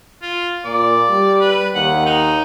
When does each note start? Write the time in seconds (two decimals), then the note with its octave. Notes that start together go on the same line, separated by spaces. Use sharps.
0.22 F4
0.65 A#2 D5
1.09 G3
1.41 B4
1.75 D#2 F#5
2.06 D#4